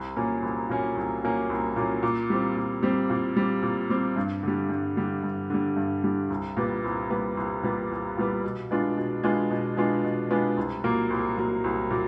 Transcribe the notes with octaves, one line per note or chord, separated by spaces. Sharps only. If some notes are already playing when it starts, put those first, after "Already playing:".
Already playing: C2
A#2 F#3 A#3 C#4
C2
A#2 F#3 A#3 C#4
C2
A#2 F#3 A#3 C#4
C2
A#2 F#3 A#3 C#4
A#2
G3 C4
A#2
G3 C4
A#2
G3 C4
A#2
G3 C4
G2
D3 G3
G2
D3 G3
G2
D3 G3
G2
D3 G3
C2
A#2 G3 B3
C2
A#2 G3 B3
C2
A#2 G3 B3
C2
A#2 G3 B3
B2
G#3 B3 D4 F4
B2
G#3 B3 D4 F4
B2
G#3 B3 D4 F4
B2
G#3 B3 D4 F4
C2
A#2 F#3 A#3
C2
A#2 F#3 A#3
C2
A#2 F#3